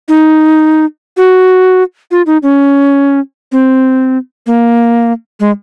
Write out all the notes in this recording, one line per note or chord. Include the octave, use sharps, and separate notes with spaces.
D#4
F#4
F4
D#4
C#4
C4
A#3
G#3